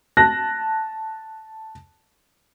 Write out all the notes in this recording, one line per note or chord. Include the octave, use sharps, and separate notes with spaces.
A5 F#6 A#6